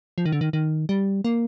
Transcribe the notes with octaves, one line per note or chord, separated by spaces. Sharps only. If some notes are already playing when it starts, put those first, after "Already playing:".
F3
D#3
D3
D#3
D#3
G3
A#3